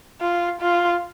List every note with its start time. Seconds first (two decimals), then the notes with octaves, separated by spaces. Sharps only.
0.21 F4
0.61 F4